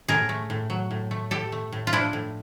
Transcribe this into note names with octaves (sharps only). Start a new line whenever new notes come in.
A2 G#4 A#4
A3
A2
F#3
A2
A3
A2 G4 A4
A3
A2
F4
F3 D4 E4
A2